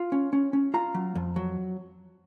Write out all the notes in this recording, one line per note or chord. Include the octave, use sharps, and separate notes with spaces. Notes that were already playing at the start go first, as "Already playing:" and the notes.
Already playing: F4
C#4
C#4
C#4
F4 A#5
F#3
F2
F#3